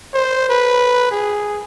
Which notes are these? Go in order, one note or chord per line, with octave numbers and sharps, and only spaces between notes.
C5
B4
G#4